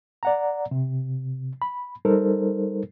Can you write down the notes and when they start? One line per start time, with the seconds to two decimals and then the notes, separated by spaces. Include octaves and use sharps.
0.23 D5 F#5 A#5
0.71 C3
1.62 B5
2.05 G3 D#4 A4 A#4 C5